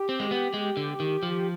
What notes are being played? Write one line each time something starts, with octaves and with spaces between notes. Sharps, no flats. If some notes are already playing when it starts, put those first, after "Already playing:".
Already playing: G4
C4
G#3
B3
G#3
D3
D#3
F3